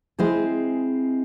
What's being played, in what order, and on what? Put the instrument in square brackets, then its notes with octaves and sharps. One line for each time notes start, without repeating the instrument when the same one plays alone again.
[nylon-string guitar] G#3 C4 E4 G#4 C5